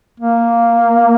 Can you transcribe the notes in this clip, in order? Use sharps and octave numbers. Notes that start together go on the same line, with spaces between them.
A#3